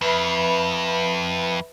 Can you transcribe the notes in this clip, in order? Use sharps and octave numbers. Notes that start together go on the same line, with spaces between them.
F2 B4 E5 B5